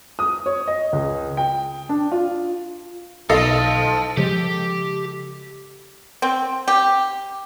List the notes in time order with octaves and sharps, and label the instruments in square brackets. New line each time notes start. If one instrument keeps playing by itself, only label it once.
[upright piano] D#6
C#5
D#5
C#2
G5
D4
F4
[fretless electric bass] B1 [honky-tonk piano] A4 D#5 [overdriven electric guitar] F5 A5
[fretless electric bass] C#3 F3 G#3 [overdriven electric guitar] G4
[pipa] C4
G4